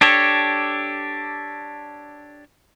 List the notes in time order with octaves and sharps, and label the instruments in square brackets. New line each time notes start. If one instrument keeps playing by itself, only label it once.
[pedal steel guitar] D4 G4 A4 C#5